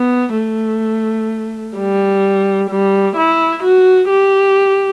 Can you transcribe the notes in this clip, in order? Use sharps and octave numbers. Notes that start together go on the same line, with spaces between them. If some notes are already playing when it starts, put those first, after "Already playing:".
Already playing: B3
A3
G3
G3
E4
F#4
G4